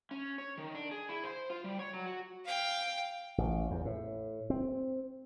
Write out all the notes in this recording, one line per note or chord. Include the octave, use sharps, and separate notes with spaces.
C#4
C#5
D#3
D4
G#4
E4
C5
F4
G3
C#5
F#3
F#4
F5 G5
A1
E2
A2
C4